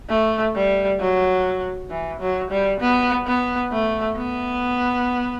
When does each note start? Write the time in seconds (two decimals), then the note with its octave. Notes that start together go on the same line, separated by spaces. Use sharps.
0.09 A3
0.55 G3
0.99 F#3
1.90 E3
2.20 F#3
2.51 G3
2.81 B3
3.26 B3
3.72 A3
4.17 B3